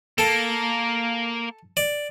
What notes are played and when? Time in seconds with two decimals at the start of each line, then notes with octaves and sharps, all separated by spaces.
0.18 A#3 A4
1.77 D5